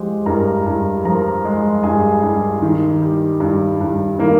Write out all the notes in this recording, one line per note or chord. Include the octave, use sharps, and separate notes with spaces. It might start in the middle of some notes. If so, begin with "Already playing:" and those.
Already playing: F3 G#3 G4
G2 A#4 A#5
G2
F3 A#4 A#5
G#3
G2 G#4 G#5
G2
D#3
G3
G2
G2
D#3 A#3 A#4